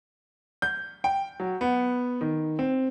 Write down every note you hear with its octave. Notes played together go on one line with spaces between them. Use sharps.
G6
G5
F#3
B3
D#3
C4